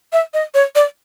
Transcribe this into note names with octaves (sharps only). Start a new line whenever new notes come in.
E5
D#5
C#5
D5